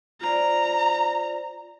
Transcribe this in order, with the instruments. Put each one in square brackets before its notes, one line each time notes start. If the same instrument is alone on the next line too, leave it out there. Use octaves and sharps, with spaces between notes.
[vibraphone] F4 C5 D5 [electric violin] A#5